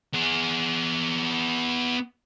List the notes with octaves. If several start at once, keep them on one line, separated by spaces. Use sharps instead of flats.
B3 G#4